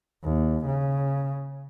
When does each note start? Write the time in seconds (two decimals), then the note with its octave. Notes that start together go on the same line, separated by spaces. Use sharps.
0.24 D#2
0.66 C#3